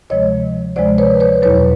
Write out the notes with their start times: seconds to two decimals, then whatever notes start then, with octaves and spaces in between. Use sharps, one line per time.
0.10 D2 C3 F3 G#3 C#5 D#5
0.76 D2 C3 F3 G#3 C5 D5
0.98 B4 C#5
1.20 B4 C#5
1.42 E2 B2 F#3 B4 C#5